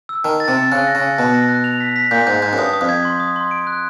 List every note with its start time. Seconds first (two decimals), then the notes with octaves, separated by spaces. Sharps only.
0.09 E6
0.25 D#3 A5
0.40 A6
0.48 C3
0.56 A6
0.72 C#3 F#6
0.87 A#6
0.95 C#3
1.03 A#6
1.18 B2 F#6
1.34 A#6
1.49 F#6
1.64 F7
1.80 B6
1.96 B6
2.11 A#2 G6
2.27 G#2 G6
2.42 G#2 G6
2.53 F#2
2.58 G2 D#6
2.73 D#6
2.81 F2
2.89 G#6
3.05 C6
3.20 D#6
3.36 C6
3.51 D7
3.67 F#6